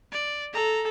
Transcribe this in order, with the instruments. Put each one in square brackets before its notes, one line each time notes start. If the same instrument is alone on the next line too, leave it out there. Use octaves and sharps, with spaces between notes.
[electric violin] D5
[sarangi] A4 [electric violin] A#5